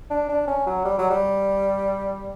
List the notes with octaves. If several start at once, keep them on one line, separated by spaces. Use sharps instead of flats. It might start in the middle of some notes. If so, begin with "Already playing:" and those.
D4
D4
C#4
F#3
G3
F#3
G3